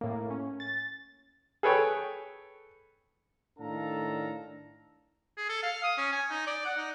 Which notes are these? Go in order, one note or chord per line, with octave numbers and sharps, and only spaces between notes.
A2 A#3
C#4
A6
G#4 A4 B4 C#5 G5
A2 D#3 D4 A4 F5 A#5
G#4
A4
F5
D#6
C#4
G#5
D#4
D5
F#5
D#4